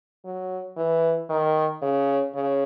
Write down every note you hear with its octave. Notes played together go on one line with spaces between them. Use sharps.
F#3
E3
D#3
C#3
C#3